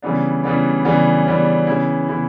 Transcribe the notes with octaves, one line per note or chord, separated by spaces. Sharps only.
C#3 E3 G3 B3 D4
C#3 E3 G3 B3 D4
C#3 E3 G3 B3 D4
C#3 E3 G3 B3 D4
C#3 E3 B3 E4
C#3 E3 B3 E4